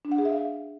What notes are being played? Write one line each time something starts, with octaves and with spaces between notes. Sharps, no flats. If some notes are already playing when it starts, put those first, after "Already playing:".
D4
F#5
G#4
E5
F5